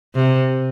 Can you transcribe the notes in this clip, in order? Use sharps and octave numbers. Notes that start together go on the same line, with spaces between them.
C3